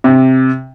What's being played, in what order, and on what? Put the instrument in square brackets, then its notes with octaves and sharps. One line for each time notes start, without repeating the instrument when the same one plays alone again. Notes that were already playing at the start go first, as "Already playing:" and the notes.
[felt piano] C3